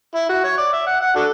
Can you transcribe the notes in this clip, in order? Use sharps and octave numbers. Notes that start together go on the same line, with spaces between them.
E4
F#4
C#5
D5
E5
F#5
F#5
D4 F#4 A4